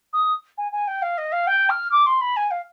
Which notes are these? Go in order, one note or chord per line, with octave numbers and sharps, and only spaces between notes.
D#6
G#5
G#5
G5
F5
D#5
F5
G5
F6
D6
C6
B5
G#5
F5